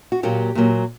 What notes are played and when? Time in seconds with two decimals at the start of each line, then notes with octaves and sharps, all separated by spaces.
0.12 F#4
0.23 A#2 F#3 A#3 G4
0.55 A#2 F#3 A#3